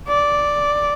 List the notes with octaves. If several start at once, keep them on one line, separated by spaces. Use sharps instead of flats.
D5